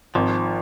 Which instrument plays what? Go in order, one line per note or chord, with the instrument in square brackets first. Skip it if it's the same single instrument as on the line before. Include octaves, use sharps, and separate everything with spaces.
[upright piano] G#1 [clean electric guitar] F3